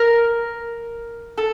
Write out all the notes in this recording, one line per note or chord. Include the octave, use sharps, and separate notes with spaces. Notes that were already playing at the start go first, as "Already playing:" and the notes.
Already playing: A#4
A4